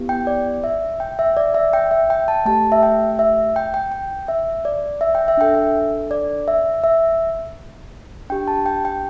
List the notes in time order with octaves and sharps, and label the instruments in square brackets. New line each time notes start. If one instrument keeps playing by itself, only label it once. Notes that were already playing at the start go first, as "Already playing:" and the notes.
Already playing: [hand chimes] B3 E4 G4
G5
D5
E5
G5
E5
D5
E5
G5
E5
G5
A5
A3 G4 A5
E5
G5
E5
G5
G5
G5
E5
D5
E5
G5
E5
D4 A4 G5
E5
D5
E5
E5
D4 G4 G5
A5
G5
G5